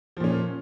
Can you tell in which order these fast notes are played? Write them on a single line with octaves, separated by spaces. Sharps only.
F3 A#2 C#4